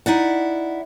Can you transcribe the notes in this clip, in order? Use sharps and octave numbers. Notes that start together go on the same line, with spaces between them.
D#4 E4 D5 F#5